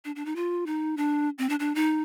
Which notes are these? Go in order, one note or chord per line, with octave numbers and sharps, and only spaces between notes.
D4
D4
D#4
F4
D#4
D4
C4
D4
D4
D#4